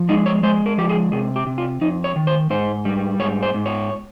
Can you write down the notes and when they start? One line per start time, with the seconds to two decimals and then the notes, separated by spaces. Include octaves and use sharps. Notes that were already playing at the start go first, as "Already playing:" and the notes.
Already playing: F3
0.09 G#3 D#4
0.26 C#5
0.43 G#3 C5
0.66 A#4
0.78 F3 G4
0.89 G#4
1.12 C3 G#4
1.36 G4
1.47 C3
1.58 F4
1.81 F2 D#4
2.04 C#5
2.16 D#3
2.27 C5
2.50 G#2 C5
2.85 G3
3.19 G#2 C#5
3.43 C5
3.54 G#2
3.66 C#5